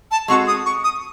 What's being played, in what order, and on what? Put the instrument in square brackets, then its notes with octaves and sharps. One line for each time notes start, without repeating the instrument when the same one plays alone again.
[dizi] A5
[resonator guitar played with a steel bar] G#3 C4 F#4 A4 [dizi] C#6
[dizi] D#6
C#6
D#6